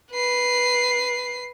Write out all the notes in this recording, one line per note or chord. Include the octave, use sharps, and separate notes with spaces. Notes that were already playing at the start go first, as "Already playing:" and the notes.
B4 C7